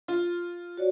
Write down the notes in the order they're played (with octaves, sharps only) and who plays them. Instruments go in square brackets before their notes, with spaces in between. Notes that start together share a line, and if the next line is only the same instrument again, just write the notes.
[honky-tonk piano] F4
[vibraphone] F#4 C#5 D5